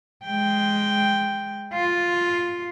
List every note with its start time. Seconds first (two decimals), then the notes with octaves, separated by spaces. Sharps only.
0.25 G#3 G5
1.73 F4